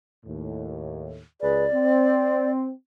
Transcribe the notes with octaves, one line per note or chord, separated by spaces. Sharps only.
D#2 A2
C#2 G#4 B4 D5
C4